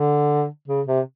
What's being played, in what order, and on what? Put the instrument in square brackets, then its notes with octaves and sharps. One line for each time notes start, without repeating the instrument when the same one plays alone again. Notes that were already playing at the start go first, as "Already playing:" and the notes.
Already playing: [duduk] D3
C#3
C3